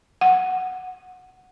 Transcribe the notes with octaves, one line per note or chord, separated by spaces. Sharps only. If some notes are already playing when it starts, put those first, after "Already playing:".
F#5